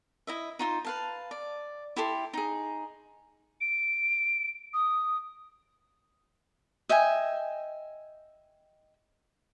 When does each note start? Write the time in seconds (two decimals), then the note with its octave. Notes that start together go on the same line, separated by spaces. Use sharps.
0.27 E4 D#5 E5
0.59 D#4 F4 C5
0.85 B4 F5 A5
1.31 D5
1.96 E4 G4 A4 C6
2.34 D#4 G#4
3.61 D7
4.74 D#6
6.89 D#5 E5 G5 G#5